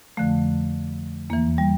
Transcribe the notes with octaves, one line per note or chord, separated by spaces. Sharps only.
F2 D3 F3 A3
E2 E3 A#3
G3